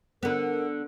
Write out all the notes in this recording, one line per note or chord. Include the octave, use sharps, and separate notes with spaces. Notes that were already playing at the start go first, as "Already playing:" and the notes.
D3 B3 A#4